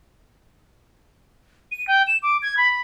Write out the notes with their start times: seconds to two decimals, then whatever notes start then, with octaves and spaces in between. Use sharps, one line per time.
1.72 D#7
1.88 G5
2.07 E7
2.23 D6
2.43 G#6
2.57 B5